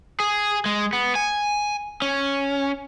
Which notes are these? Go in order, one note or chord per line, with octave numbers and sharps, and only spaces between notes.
G#4
G#3
B3
G#5
C#4